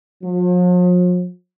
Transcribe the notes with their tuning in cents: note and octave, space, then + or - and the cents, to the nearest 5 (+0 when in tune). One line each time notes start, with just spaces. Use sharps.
F3 +45